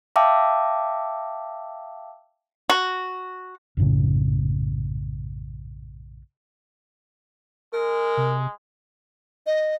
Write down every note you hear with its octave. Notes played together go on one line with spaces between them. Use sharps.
E5 F5 G5 A5 D6 E6
F#4
A#1 F#2 A2 C#3
G#3 A#4
C3
D#5